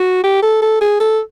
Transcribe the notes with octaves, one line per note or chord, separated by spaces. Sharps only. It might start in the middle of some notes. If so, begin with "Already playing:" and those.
Already playing: F#4
G4
A4
A4
G#4
A4